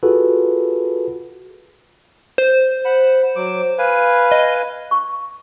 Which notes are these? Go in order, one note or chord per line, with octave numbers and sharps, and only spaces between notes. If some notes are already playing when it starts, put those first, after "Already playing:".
F4 F#4 G#4 A4 B4
C5
F#5 B5
F#3 D6
B4 F5 G#5
D#5
C#6